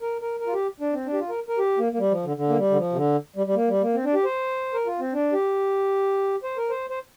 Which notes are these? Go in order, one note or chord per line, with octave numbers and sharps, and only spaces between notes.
A#4
A#4
A#4
F4
G4
D4
C4
D4
G4
F4
A#4
A#4
G4
A#3
A#3
G3
F3
D3
D3
A#3
G3
D3
F3
C3
D3
G3
G3
A#3
G3
A#3
C4
D4
G4
C5
A#4
F4
C4
D4
G4
C5
A#4
C5
C5